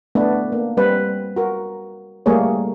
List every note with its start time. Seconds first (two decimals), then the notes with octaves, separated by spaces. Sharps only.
0.15 A3 B3 D4 B4
0.52 A#3
0.77 G3 C4 B4
1.36 F#4 A#4
2.26 G3 A3 A#3 G#4 C#5